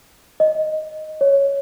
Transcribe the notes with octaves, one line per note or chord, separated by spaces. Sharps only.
D#5
C#5